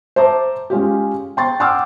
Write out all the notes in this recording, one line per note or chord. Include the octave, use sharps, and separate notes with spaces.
C5 E5 A5 A#5 D6
G#3 C#4 F4 G4
G5 C6 A6
F#5 G5 C6 D6 E6 F6